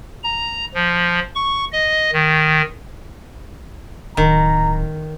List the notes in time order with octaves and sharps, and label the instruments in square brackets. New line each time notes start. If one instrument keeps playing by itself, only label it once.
[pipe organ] A#5
F3
C#6
D#5
D#3
[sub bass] D1 [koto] D#3 [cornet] A#5